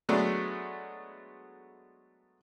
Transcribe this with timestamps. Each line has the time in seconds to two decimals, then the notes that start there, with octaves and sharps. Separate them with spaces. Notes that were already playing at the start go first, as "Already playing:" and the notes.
0.09 F#3 G#3 A3 B3 D4